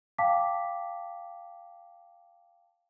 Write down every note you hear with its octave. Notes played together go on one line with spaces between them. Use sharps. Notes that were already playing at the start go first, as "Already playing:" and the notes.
F5 G5 A5 D6 B6